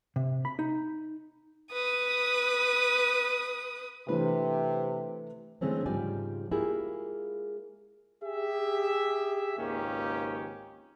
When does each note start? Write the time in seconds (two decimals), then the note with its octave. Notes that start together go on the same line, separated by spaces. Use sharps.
0.16 C3
0.45 B5
0.59 D#4
1.72 B4 D#6
4.08 C3 E3 A3 D4 B4
5.61 D3 E3 G#3 A3 C4 C#4
5.86 G#2 C#3 F3 G3 D5 G#5
6.51 G#3 A#3 E4 F4 G4 G#4
8.23 G4 G#4 E5
9.58 G#1 C#2 D#3 A#3 C#4 G4